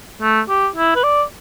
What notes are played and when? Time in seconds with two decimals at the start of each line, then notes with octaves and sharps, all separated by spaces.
0.22 A3
0.49 G4
0.76 E4
0.95 B4
1.03 D5